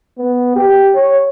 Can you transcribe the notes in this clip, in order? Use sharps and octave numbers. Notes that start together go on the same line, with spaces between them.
B3
G4
C#5